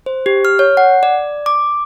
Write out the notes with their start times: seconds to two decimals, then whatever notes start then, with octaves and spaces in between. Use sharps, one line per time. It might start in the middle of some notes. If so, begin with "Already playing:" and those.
0.06 C5
0.26 G4
0.45 F6
0.59 C#5
0.77 F#5
1.03 D5
1.46 D6